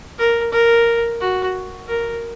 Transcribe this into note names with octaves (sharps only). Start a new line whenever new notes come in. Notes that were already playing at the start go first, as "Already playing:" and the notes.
A#4
A#4
F#4
A#4